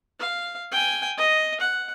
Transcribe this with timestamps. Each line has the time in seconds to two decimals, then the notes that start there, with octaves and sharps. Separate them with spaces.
0.20 F5
0.72 G5 G#5
1.18 D#5
1.60 F#5